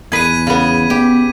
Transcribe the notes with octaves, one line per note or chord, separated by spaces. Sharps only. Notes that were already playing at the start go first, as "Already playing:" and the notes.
E2 G#4 B4 G#6 B6 D#7
C#3 B3
B3 G4